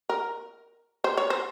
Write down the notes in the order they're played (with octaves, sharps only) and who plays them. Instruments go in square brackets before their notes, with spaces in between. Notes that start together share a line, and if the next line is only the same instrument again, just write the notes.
[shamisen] A#4
C5
C#5
C5